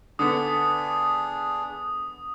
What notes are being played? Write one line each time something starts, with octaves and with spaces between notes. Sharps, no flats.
D3 B3 D4 G#4 D#6